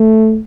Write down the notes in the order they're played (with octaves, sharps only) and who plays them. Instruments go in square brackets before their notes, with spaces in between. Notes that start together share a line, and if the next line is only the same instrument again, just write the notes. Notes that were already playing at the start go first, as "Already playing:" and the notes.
Already playing: [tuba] A3